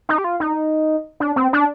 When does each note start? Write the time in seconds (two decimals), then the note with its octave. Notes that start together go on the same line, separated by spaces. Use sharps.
0.09 D#4
0.18 G4
0.24 F4
0.40 D#4
1.20 D4
1.36 C4
1.53 D4